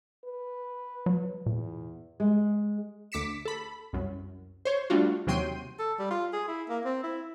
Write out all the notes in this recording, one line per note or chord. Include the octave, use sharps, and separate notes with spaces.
B4
F#3
E2 A#2
G#3
D2 D6 B6 C#7 E7
A4 B5
C2 F#2
C5 C#5
G3 A3 D4 F4 F#4
D#2 C3 F#3 G5 C6 D#7
A4
G3
F4
G#4
E4
A#3
C4
E4